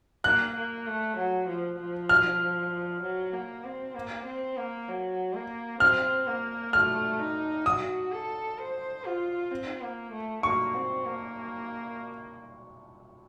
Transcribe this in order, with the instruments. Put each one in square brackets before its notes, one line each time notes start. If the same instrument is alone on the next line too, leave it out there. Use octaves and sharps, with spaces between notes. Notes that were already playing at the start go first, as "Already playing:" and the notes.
[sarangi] A#3 [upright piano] F#6
[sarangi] A#3
A3
F#3
F3
F3
[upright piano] F6
[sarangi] F#3
A#3
C4
A#3
C4
A#3
F#3
A#3
[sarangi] C4 [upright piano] F6
[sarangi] A#3
[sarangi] A3 [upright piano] F6
[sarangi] D#4
[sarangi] F#4 [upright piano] D#6
[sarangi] A4
C5
F4
C4
A#3
A3
[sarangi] A#3 [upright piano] C#6
[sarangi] C4
A#3